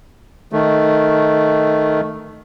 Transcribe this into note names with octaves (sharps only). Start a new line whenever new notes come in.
D#3 A3